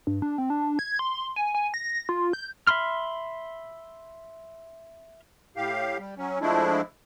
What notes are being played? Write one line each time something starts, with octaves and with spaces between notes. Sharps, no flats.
G2
D4
C4
D4
G#6
C6
G#5
G#5
A#6
F4
G6
E5 B5 C6 F6
A2 G4 F5
G3
F#3 C#4
F3 G#3 A3 D4 E4